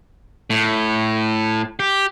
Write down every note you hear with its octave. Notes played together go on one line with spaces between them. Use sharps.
A2
G4